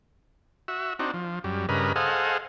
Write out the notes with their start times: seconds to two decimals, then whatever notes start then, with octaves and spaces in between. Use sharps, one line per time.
0.68 F#4 E5
0.99 C4 D4 D#4 F#4
1.14 F3
1.44 F#2 G3
1.69 G2 C#3 A#4 B4 D#5
1.96 G#4 A4 C5 D#5 F5 F#5